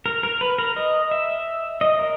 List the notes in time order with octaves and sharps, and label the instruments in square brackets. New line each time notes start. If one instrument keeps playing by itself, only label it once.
[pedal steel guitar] A#4
A#4
B4
A#4
D#5
E5
D#5
A#4